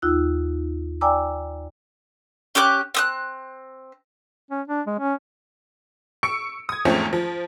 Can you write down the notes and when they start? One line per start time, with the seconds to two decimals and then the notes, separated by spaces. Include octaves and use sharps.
0.02 D#2 D#4 F4 E6 F#6
1.01 D5 G5 G#5 A#5 D6 E6
2.55 C#4 G4 D6 F#6
2.95 C4 D#6 F#6
4.51 C#4
4.68 D4
4.87 G#3
4.99 C#4
6.23 C#6 E6 C#7 D7
6.69 D#6 G#6
6.85 E2 G#2 F3 A3 C4 C#4
7.13 F3